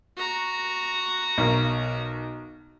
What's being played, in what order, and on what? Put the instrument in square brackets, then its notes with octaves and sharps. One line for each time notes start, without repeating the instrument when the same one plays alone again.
[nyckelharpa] F#4 A#5
[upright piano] B1 A#4